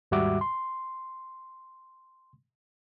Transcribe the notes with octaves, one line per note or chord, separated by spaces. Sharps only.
D#2 G#2 G3 F#4 E5 D6
C6